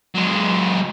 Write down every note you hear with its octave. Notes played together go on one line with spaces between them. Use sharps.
F#3 G#3